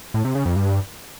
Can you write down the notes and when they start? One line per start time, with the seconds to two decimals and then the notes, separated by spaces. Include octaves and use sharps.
0.14 A2
0.25 C3
0.35 C#3
0.46 F2
0.56 G2